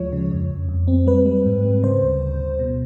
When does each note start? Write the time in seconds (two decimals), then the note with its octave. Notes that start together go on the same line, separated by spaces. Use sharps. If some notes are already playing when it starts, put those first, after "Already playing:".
Already playing: D2 F3 G#3 C#5
0.12 C#3
0.31 F2
0.50 F2
0.69 F2
0.88 C4
1.07 G3 B4
1.26 G3
1.46 G#2
1.65 G3
1.83 C#3 C5
2.02 D2
2.21 D2
2.40 D2
2.59 B2